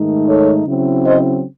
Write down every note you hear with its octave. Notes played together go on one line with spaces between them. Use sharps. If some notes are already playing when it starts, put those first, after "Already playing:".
Already playing: G#2 D#3 A3 D#4
A4 C#5
C#3 F#3 C4 E4
C5 D#5